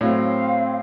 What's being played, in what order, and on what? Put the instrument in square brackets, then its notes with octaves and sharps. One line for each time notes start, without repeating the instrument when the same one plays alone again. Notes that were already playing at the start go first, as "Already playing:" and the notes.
[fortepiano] A2 F#3 [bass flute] C4 [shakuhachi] F5